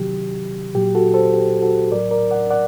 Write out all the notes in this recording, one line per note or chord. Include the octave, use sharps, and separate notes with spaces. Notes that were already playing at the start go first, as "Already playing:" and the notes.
Already playing: C3 D#3 F#3 G4
A#2 F#3 G4
F#4 A4
A4 C5
G4
F#4 A4
A2 F#3 A#4 D5
A#4 D5
D5 F#5
D5 F#5